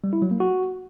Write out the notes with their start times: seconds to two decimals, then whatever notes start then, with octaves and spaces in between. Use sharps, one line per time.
0.04 G3
0.13 E4
0.22 F#3
0.31 A#3
0.40 F#4